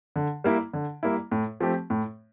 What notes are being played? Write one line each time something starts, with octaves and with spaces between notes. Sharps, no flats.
D3
G3 A#3 E4
D3
G3 A#3 E4
A2
F3 A3 C4 G4
A2